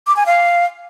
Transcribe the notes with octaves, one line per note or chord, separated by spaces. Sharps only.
D6
G#5
F5